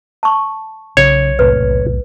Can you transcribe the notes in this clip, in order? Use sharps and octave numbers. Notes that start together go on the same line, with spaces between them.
A5 C#6
B1 C#3 C#5
E1 C2 A2 B4